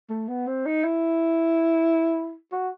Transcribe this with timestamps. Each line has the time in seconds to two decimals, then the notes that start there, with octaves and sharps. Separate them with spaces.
0.10 A3
0.28 B3
0.47 C4
0.66 D#4
0.84 E4
2.52 F#4